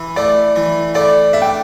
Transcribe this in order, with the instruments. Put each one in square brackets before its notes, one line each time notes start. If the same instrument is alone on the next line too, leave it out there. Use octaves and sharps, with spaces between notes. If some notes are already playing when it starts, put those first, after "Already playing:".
Already playing: [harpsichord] E3
[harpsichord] A3 [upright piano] D5
[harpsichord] E3
[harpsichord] A3 [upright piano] D5
[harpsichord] D4 [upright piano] E5
[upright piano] G5